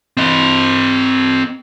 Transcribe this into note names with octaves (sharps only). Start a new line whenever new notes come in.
C4 D#5